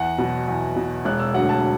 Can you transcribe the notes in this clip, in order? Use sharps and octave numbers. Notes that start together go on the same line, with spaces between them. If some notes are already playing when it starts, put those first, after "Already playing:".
Already playing: E2 F#5
B2 F#3
E2
B2 F#3
E1 F#6
E6
D2 D3 F#3 F#5
A5